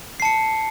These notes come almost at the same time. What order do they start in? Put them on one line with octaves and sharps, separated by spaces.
C7 A5 C#7